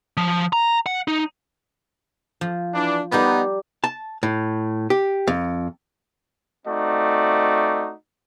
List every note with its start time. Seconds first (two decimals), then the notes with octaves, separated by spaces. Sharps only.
0.17 F3
0.53 A#5
0.86 F#5
1.08 D#4
2.41 F3
2.74 E3 D4
3.12 G3 B3 D#4 G4 A#4
3.84 A5
4.23 A2
4.90 G4
5.27 F2
6.66 A3 C4 D#4 F#4 D5